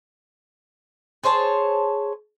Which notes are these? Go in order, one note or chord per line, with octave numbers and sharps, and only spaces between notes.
G#4 C5 C#5 A5